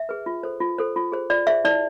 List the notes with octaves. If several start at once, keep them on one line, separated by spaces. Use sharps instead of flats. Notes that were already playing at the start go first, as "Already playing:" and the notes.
Already playing: E5
G#4 B4
F4
A4 C5
F4
A4 C5
F4
G#4 C5
F4 D5
G#4 C5 E5
E4 D5